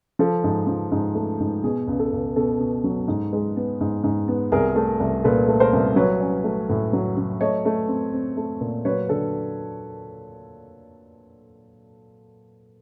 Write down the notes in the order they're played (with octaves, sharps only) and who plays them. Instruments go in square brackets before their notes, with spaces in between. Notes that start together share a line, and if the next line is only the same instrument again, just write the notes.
[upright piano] F3 A4
G#2
F3
G#2
A3
G#2
B2 G#4
C#2
A4
C#2
B2 A4
B2
F#3
G#2
G#3
B3
G#2
G#2
B3
C2 G#4 A#4
A3
C2
A#2 A4 B4
A3
A#4 C5
C2
F#3 B4 C#5
C#4
A3
A2
F#3
F#3
A3 C#5 D#5
A3
C4
C4
A3
A#2
F#3 B4 C#5
D3 A4